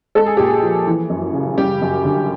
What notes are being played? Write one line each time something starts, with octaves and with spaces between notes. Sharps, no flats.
G#3 A4
G#4
A#2 G4
G#4
F3
E3
F#2
C#3
G3 G4
F#2
D3